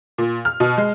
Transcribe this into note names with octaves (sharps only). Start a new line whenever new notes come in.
A#2
F6
B2
G#3